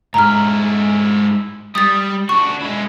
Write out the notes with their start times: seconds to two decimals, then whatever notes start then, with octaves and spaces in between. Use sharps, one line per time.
0.14 G#2 E4 A#5 F6
1.75 G3 D#6 A6
2.29 D4 F#4 C#6
2.61 G#3 E4